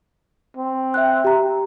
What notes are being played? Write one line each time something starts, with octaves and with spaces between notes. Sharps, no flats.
C4
E5 G5 F#6
G4 A#5